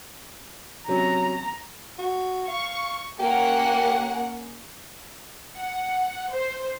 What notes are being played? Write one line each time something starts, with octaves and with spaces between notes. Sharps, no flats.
C3 F#3 C#4 A#5
F#4
F5 C#6
A#3 C#4 G4 F#5
F#5
C5